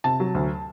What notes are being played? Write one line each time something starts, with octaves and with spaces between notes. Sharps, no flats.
C3 A5
F#3
D2